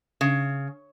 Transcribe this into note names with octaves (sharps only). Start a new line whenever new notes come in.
C#3